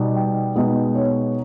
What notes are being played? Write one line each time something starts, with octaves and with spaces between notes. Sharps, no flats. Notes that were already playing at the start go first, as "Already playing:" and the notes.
Already playing: B2 G3 B3 D#4
G5
B2 G#3 B3 D#4
C#5